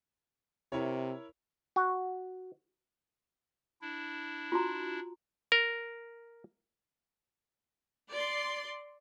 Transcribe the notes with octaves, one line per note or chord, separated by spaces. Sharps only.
C3 E4 A#4 C#5
F#4
D4 E4
F4 F#4 A#5
A#4
D5 C6